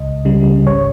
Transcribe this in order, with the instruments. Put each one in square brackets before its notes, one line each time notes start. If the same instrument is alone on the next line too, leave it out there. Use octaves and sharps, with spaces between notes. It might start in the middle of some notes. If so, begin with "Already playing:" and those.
Already playing: [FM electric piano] C#2 D#5
C#3 G3
G#1 C#5